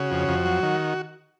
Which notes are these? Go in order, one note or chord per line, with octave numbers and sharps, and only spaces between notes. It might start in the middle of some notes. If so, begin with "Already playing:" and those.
Already playing: C#3 F#4
F2
F2
F#3
D#3